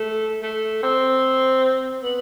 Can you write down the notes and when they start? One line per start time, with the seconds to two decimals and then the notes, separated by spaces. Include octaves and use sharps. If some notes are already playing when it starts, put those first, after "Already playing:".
Already playing: A3
0.43 A3
0.83 C4
2.03 B3